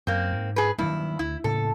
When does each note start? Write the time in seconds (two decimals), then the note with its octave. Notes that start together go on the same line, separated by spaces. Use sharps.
0.07 F#2 A#3 C4
0.32 G#2
0.56 G#4 B4
0.78 G2 D#3 F#3 A#3 E4
1.19 D2 E4
1.44 A2 C#3 A#3 A4